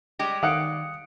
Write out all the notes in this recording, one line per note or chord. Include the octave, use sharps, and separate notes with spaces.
G3 G#3 G4 A#6
D#3 F5 F#5 D#6 C#7 D7